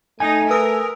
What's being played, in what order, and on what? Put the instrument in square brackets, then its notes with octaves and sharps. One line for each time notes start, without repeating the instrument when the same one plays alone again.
[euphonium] A3 [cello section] D#4 [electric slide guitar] G#5
[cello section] A#4 [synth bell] B4 D#6 E6